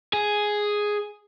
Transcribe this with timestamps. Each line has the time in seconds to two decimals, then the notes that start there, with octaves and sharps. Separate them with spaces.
0.13 G#4